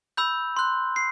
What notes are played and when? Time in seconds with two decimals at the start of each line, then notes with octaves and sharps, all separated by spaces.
0.17 B5 E6 G6
0.57 C6 F#6
0.96 C7